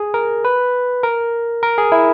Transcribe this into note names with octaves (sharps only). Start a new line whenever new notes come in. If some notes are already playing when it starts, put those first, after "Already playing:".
Already playing: G#4
A#4
B4
A#4
A#4
G#4
E4